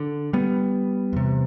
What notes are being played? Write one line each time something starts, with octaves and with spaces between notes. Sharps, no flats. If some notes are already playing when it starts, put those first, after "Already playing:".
Already playing: D3
G3 B3
E2 C3